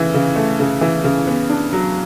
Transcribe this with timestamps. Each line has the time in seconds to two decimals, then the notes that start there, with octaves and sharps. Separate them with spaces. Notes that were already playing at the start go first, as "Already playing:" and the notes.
Already playing: C#3 E3
0.14 C#3
0.36 A3
0.60 C#3
0.81 E3
1.04 C#3
1.27 B3
1.50 D4
1.73 F#3